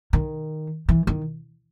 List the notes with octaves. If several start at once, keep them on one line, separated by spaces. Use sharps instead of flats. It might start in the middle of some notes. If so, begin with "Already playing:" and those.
D#3
E3
D#3